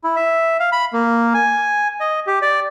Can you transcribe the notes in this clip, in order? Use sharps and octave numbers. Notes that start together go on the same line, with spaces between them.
E4
E5
F5
B5
A#3
G#5
D#5
G4
D5